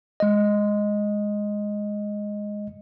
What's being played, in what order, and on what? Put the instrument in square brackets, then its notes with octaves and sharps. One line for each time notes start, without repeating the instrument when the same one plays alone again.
[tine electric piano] G#3 D#5